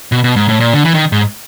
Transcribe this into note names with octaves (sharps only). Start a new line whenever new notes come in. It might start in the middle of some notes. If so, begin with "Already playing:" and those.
B2
B2
G#2
A2
A#2
D3
E3
D#3
G#2